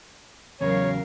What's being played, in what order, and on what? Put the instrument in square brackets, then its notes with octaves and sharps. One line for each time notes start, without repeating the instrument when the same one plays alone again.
[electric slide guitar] E2 C#3 [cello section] F#3 A#4 F5 [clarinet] C#5